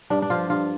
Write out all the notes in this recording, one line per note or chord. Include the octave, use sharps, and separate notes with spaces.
G2 D4
D4
F3 F4
G2 F4